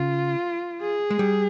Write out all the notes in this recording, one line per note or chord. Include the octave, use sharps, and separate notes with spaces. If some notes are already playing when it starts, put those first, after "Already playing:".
Already playing: C#3 F4
G#4
G#3
G3